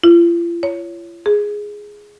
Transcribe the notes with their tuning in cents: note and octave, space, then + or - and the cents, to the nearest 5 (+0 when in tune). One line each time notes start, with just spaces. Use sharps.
F4 -40
C#5 +10
G#4 +0